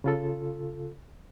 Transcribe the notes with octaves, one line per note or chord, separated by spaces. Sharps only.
C#3 F4 A4